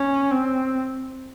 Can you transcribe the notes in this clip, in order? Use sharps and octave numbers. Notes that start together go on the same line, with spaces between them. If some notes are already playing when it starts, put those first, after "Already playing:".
Already playing: C#4
C4